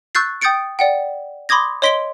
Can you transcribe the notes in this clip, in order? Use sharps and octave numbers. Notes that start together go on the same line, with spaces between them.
C#6 E6 F#6 G6 A6 C7
G5 D#6 G6 A6 C#7 D7
D5 F#5 G5
B5 C6 D6 D#6 G#6 A#6
C#5 D#5 C6 B6 D7 G7